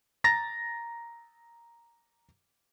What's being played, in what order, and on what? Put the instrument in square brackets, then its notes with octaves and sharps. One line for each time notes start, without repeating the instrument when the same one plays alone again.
[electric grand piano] A#5 A6 A#6